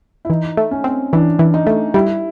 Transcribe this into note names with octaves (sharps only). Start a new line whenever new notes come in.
E4
E3 D#4
A3
C#4
C4
E3 D4
E3
D#4
A3
G3 E4